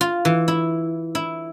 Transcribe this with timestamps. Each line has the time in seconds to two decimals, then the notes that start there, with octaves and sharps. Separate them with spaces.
0.01 F4
0.25 E3
0.48 E4
1.15 E4